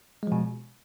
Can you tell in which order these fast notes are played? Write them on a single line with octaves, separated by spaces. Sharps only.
G#3 F3 B2